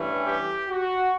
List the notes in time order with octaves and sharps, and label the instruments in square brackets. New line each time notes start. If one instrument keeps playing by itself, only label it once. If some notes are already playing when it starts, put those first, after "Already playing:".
Already playing: [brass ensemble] G2 E3 A3 C#4
G4
F#4